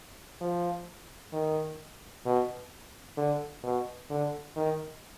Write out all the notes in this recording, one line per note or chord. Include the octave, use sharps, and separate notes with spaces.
F3
D#3
B2
D3
B2
D3
D#3